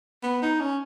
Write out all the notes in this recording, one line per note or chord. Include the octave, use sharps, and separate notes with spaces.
B3
D#4
C#4